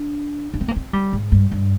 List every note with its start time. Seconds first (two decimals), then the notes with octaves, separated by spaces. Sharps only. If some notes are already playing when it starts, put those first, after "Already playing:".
Already playing: D4
0.54 D4
0.61 C4
0.68 A#3
0.76 C4
0.93 G3
1.13 G#2
1.32 G2
1.52 G2